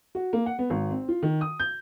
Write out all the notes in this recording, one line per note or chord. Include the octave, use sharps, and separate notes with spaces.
F#4
A#3
F#5
B3
G#1
C4
F4
D#3
D#6
G6